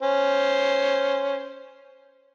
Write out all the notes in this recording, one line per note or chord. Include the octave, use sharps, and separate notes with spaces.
C#4 C5